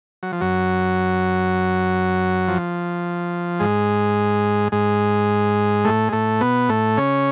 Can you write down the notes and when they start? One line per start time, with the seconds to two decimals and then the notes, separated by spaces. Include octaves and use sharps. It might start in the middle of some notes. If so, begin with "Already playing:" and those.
0.23 F#3
0.32 F3
0.41 F#2 F#3
2.48 F3
3.60 G#2 G#3
4.72 G#2 G#3
5.84 A2 A3
6.09 G#3
6.12 A2 A3
6.41 B2 B3
6.69 A2 A3
6.97 C#3 C#4